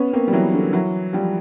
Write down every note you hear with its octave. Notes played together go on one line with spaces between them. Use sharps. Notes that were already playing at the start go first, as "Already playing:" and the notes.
Already playing: B3 C#4
A#3 C4
G3
E3 F#3
D3
E3 F#3
F3 G3